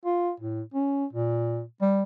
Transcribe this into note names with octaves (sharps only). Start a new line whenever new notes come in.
F4
A2
C#4
A#2
G3